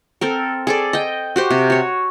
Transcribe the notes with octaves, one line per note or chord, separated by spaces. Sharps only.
C4 A4 A#4
G#4 A4 D5
D#5 G5
F#4 G4 C5
C3
F#4 C#5